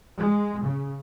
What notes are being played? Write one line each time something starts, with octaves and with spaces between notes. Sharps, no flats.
G#3
C#3